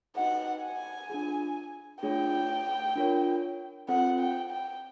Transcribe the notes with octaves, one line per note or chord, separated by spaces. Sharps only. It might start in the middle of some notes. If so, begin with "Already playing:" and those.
D#4 F#4 B4 D#5 F#5 G5
G#5
D4 F4 G#4
A3 D4 F4 G#4 C#5 G5
D4 F4 A#4 C#5
C4 F4 A4 C5 F#5
G5
G5